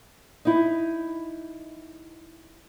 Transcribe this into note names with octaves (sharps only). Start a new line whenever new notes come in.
D#4 E4